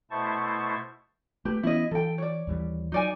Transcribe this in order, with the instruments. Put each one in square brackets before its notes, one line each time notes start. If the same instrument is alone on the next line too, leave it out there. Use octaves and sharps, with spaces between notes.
[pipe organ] B2 A3 E4 C5 A5 C#6
[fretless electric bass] A3 [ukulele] G4 B4
[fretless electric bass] E3 B3 C#4 [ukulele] E4 D#5
[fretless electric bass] E3 [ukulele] A4 G5
[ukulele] C#5 D5
[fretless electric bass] D#2 E3 G3
[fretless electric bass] F#3 [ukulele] D#4 D5 G#5